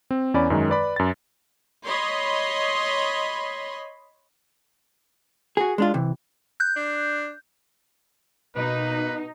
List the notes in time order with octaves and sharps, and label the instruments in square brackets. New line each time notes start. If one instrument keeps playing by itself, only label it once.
[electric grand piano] C4
E2 C#4 D5 B5
F#2 D#3 G#3
B4 D5 B5
F#2 A6
[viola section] C#5 D#5 B5 C6
[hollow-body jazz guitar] F#4 G#4
G#3 D4 F4
C3 E3
[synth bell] F#6 G6
[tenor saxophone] D4
[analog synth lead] B2 [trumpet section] A#3 B4 [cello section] D#4